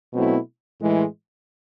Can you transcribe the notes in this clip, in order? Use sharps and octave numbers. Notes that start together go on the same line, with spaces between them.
B2 F#3 A3 C4 E4
A2 E3 G#3